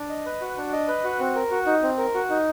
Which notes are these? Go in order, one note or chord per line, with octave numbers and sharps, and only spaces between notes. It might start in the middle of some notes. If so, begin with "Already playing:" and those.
Already playing: D4
D#5
B4
F#4
D4
D#5
B4
F#4
C4
A#4
F#4
D#4
C4
A#4
F#4
D#4